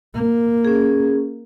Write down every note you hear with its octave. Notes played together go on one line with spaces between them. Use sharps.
A#3
C#4 G#4